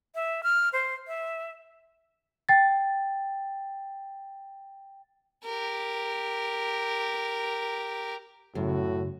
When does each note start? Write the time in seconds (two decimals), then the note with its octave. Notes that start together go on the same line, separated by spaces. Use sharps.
0.15 E5
0.43 F6
0.73 C5
1.07 E5
2.49 G5 A6
5.45 G4 A#4
8.55 F#2 A2 C#3 F#4